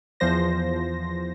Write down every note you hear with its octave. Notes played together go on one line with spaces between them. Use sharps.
E2 F3 C5 A#6